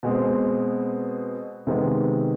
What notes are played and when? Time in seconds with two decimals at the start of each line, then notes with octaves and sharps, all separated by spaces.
0.03 B2 G#3 C4
1.67 C3 D#3 G#3 B3